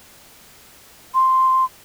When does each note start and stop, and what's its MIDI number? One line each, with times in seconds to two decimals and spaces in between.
1.14 1.65 84